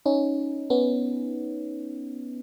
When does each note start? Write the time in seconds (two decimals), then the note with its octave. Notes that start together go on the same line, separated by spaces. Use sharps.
0.06 C#4 D#4
0.70 B3 C#4